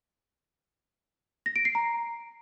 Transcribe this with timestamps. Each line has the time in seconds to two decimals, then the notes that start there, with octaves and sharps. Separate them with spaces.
1.46 A#6
1.56 D7
1.65 C7
1.75 A#5